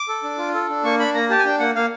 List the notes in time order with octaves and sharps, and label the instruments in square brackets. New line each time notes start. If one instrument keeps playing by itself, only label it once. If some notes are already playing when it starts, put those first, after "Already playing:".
Already playing: [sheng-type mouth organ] D6
A4
D4
F4
A4
D4
A#3 C#6
D4 B5
A#3 A#5
G4 A5
G#5
D4 G5
A#3 F#5
A#3 F5